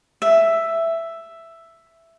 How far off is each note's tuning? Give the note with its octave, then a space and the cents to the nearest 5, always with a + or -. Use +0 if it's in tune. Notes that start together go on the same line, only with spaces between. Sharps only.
E5 +5